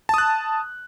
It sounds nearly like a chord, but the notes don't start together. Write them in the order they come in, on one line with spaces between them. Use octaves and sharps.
A5 D#6 F#6